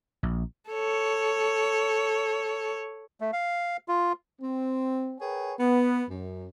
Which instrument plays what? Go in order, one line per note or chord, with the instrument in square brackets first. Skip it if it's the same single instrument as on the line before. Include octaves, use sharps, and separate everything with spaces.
[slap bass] A#1
[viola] A4 C#5
[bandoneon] A3
F5
F4
[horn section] C4
G#4 A#4 B4 C#5 G5 G#5
B3
F#2